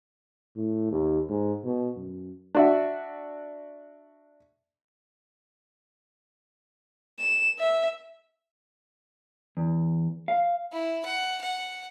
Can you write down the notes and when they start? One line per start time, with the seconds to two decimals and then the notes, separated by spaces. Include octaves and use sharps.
0.56 A2
0.92 D#2
1.29 G#2
1.64 B2
1.97 F#2
2.55 D4 F#4 E5
7.19 E7
7.59 E5
9.57 E2
10.28 F5
10.73 E4
11.05 F#5
11.41 F#5